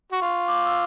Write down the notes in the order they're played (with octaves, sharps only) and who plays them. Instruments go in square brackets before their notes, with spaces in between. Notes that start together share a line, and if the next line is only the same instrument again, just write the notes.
[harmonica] F#4
[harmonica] F4 [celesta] C#6
[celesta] D6
E6